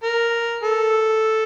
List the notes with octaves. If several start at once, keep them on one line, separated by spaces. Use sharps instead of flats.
A#4
A4